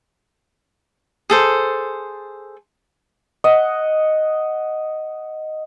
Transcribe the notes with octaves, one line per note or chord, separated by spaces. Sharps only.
G#4 A4 C5
D#5 F#5